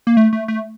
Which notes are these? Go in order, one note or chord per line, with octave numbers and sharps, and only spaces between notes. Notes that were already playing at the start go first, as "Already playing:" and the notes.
A#3
A3
A3
A3